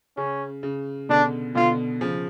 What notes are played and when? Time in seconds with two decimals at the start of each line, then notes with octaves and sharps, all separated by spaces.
0.17 C#3 C#4
0.63 C#3
1.09 B2 D3 D4
1.55 B2 D3 F4
2.01 C#3 F3